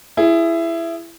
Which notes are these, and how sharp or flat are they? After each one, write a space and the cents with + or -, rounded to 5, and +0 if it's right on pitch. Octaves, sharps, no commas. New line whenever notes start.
E4 +15 G#4 +0